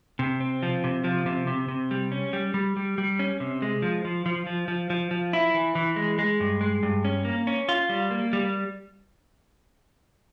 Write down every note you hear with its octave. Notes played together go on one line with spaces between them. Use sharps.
C3
C4
F3
C3
F3
C3
C3
C3
G3
C#4
G3
G3
G3
G3
C#4
C3
G#3
F3
F3
F3
F3
F3
F3
F3
E4
E3
E3
G#3
G#3
G2
G#3
G2
C#4
A#3
C#4
F4
G3
A#3
G3